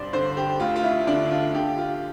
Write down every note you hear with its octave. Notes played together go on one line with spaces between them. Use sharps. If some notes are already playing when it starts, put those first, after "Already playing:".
Already playing: C2 G2 C5 D5
D3 C5
G4
D2 F4
F4
E4
D3 D4
F4
D3 G4
F4